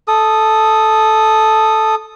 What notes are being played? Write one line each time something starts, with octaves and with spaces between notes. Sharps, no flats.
A4 D#6